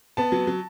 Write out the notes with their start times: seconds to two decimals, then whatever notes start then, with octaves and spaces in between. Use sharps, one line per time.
0.17 B3 A5
0.32 F#3
0.47 F#3